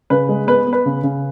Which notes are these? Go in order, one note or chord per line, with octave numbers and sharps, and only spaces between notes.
C#3 B4
G#3
B3 B4
B3
B4
C#3
C#3